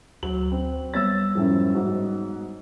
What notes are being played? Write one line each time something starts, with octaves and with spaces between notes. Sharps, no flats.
D2 F#3 F#7
C4
G3 B3 C#5 E6 A6
F#2 A2 F3
G#2 F#4